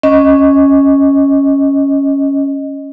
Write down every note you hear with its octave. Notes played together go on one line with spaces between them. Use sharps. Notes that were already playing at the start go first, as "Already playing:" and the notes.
C#4 D#5